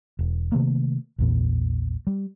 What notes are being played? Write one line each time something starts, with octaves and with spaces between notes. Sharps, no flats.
E1
C3 D#3 A3 A#3
A#1 E2 A#2
G3